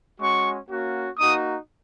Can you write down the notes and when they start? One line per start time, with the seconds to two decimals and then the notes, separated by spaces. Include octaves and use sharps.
0.19 G#3 C#4 F#4 C#6
0.69 A#3 C#4 F#4
1.18 A#3 D#4 F#4 D#6